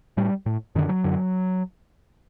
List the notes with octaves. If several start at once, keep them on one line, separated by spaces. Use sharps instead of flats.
A2 G3
A2
F#2 D3 D#3
F#3
F#2 D3